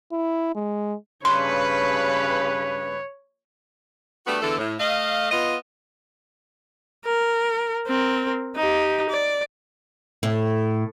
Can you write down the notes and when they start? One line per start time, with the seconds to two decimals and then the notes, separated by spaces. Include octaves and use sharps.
0.12 E4
0.55 G#3
1.25 G2 C#3 B4 C#5 C6
4.26 G3 A3 B3 D4 F#4 G4
4.41 E2 D3 E3 A4
4.57 A2
4.79 A3 D#5 F5
5.31 B3 F4 D#5
7.05 A#4
7.87 C4 A#4
8.56 D#4 G4
9.10 D5
10.23 A2